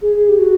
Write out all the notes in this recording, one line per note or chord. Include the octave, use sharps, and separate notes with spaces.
G#4
G4
F#4